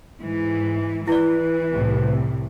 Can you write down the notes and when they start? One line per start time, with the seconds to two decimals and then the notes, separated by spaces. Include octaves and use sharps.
0.21 G#2 E3
1.08 E3 E4 B4 D5
1.73 C2 A2 C3